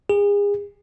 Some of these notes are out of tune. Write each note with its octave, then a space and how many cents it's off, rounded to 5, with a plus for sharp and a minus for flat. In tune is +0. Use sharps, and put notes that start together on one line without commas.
G#4 -35